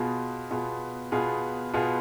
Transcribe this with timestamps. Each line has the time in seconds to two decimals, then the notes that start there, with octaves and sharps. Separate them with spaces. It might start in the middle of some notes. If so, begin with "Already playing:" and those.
Already playing: B2 B3 F4 G#4
0.50 B2 B3 F4 G#4
1.12 B2 B3 F4 G#4
1.74 B2 B3 F4 G#4